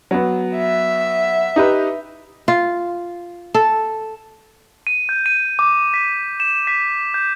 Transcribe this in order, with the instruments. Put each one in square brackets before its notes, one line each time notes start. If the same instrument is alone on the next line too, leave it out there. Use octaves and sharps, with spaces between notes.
[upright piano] F#3 B3
[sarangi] E5
[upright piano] D#4 G4 B4
[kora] F4
A4
[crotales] D#7
G6
D#7
D6
B6
E7
B6
G6